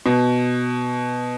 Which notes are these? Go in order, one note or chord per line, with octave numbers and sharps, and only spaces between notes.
B2